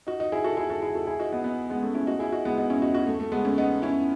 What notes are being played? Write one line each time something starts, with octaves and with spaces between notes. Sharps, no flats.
D#4 F#4
D#4 F#4
E4 G#4
F#4 A4
E4 G#4
F#4 A4
E4 G#4
F#4 A4
E4 G#4
D#4 F#4
B3 D#4
B3 D#4
G#3 B3
A3 C#4
C#4 E4
D#4 F#4
E4 G#4
D#4 F#4
G#3 B3
B3 D#4
C#4 E4
D#4 F#4
D#4 F#4
A3
A3
G#3 B3
A3 C#4
B3 D#4
C#4 E4